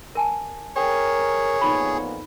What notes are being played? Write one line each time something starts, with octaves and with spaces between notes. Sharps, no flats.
A#4 G#5 A5
G#4 A#4 C#5 G5
F2 A#2 B3 D#4 B5